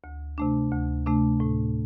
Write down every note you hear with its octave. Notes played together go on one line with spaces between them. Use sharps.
D2
C3 A3 D4
D2
C3 A3 D4
A2